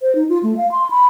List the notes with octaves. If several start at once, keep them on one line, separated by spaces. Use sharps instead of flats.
C5
D#4
F4
A3
F5
C6
B5